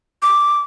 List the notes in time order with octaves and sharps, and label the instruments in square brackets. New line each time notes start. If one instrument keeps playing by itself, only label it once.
[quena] D6